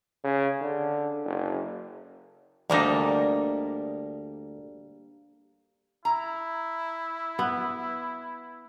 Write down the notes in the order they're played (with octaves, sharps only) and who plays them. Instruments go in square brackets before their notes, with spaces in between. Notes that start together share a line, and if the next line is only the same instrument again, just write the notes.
[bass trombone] C#3
D3
F#1
[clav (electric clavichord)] D2 D#4 [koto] G3 A#3 D4
[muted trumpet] E4 [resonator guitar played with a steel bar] A#5
[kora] B3